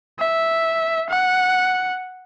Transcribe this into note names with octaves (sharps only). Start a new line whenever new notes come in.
E5
F#5